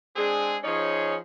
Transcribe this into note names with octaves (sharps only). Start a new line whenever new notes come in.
G#3 C4 D4 G#4
F3 C#4 D#4 G#4 C#5